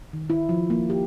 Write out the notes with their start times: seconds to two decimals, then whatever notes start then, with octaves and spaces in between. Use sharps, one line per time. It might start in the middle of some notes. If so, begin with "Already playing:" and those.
0.13 D#3
0.30 E4
0.49 F3
0.70 A#3
0.90 G4